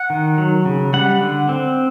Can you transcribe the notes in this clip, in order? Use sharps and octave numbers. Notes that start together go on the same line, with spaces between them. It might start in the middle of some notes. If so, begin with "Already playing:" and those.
Already playing: F#5
D#3
F#3
C#3
G3 F#5
D3
C4